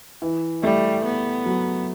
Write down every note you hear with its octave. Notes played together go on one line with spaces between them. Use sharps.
E3
G3 A3
B3
F#3